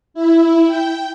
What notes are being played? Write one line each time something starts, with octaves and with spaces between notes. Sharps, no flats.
E4
G5